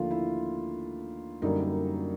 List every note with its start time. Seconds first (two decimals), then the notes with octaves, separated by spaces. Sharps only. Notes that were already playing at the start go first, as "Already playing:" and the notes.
Already playing: D#2 D3 F3 A3 F4
0.11 E4
1.42 F#2 D3 G3 A#3 D#4